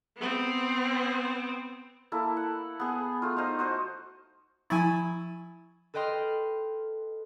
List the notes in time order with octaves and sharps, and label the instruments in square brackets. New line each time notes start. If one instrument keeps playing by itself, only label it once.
[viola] B3 C4
[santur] A#3 E4 A4
F#5
B3 G#4
A3 F4
D#4 C5 D#5 F5
F#4 C5 D#5
[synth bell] F3 C#6 A6 [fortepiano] E4 G#5
[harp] A4 B4 D#5 G5 C6 F6